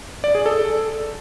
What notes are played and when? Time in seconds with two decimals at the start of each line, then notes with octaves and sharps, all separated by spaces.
0.24 D5
0.35 G#4
0.46 A4